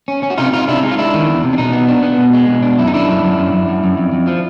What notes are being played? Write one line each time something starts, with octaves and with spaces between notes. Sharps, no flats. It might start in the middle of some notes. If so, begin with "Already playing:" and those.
C#4
C#4
F#4
C3 D#4 F4
C3 D#4 F4
C3 D4 E4
G#3 D#4
F4
G#3 D4 E4
D#3
E2
C3
D4
B2 D#4
B3
D4
B3
B2
G#3
B2
D4
F#2 E4
D#4
D3 D4 E4
F#2
F#2
F#2
F#2
F#2
F#2
F2
F2
F3